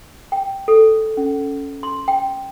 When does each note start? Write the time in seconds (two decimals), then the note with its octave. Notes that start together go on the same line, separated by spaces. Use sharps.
0.32 G5
0.68 A4
1.17 C#4
1.83 C6
2.08 G5